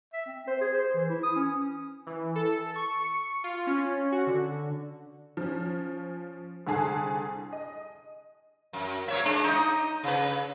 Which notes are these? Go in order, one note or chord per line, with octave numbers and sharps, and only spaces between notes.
E5
C4
C5
G#4
C5
E3
E4
D#6
C#4
E3
A4
C#6
F4
C#4
F#4
D3
F3 C#4
C2 D3 G#4 A5 C7
D#5
F#2
A#2 C#5 E5
G#3 D4
D#4 D#5
C#3 B4